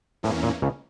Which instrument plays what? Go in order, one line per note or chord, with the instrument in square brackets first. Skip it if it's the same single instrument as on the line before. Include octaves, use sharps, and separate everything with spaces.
[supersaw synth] E2 E3 A#3 C#4 [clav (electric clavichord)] A2
[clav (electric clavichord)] A#2
C#2 C#3